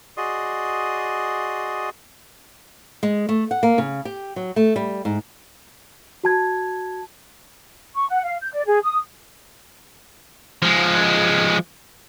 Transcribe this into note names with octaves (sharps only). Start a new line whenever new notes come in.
F#4 G#4 D5 D#5 C6 D#6
G#3
A3
F#5
A#3
C#3
G4
F#3
A3
G3
G#2
F#4 A5 G#6
C#6
F#5
F5
G6
D5
G#4
D#6
F3 G#3